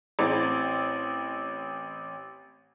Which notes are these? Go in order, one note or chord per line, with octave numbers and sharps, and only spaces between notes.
A1 C4 A6